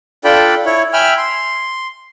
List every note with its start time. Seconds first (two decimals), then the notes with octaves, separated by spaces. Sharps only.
0.24 D4 F4 A4 D5 G5 B5
0.65 E4 C#5
0.93 E5 G5 G#5 B5 E6 F6
1.18 C6